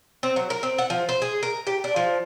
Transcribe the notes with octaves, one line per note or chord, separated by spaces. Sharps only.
C4
F#3
A#4
C4
F#5
F3
C5
G#4
A#4
G4
D4
F3